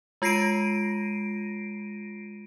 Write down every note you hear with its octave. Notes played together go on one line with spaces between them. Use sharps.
G#3 F4 A#6 C7 D7 D#7